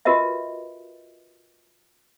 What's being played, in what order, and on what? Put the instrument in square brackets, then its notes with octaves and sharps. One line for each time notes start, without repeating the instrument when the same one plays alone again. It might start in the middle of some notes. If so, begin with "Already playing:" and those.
[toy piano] F4 F#4 A#4 B4 D#5 E5